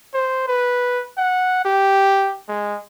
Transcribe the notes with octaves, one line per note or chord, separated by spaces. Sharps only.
C5
B4
F#5
G4
G#3